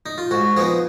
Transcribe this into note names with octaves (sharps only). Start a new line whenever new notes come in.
D#4
F4
G#2 F#4
F3 B3 D#4 G#4